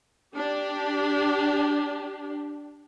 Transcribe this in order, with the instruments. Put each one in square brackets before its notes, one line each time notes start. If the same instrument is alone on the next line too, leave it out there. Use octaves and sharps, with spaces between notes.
[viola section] D4 G4